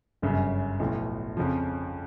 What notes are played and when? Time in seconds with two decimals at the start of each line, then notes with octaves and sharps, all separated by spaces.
0.22 G1 F#2 C#3
0.79 B1 A2 F3
1.37 F2 C#3 F3